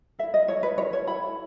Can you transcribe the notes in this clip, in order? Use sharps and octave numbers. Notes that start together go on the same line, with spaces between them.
E4 A4 E5
D#5
E4 A4 C#5
B4
E4 A4 C#5
C#5
E4 A4 B5